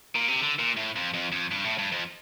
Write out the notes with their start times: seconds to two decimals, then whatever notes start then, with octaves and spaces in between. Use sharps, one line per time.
0.16 A#2
0.28 C3
0.41 D3
0.59 A#2
0.77 A2
0.96 F2
1.14 F2
1.32 F2
1.51 G2
1.64 A2
1.79 G2
1.92 F2